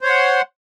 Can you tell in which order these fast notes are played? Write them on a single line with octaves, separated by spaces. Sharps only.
C5 C#5 C6 F#5